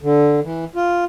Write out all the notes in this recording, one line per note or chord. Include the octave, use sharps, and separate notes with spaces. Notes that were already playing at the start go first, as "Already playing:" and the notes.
D3
E3
F4